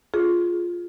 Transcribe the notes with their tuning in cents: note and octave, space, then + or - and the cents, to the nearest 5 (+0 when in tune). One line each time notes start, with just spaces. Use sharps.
F4 +0 G#4 +10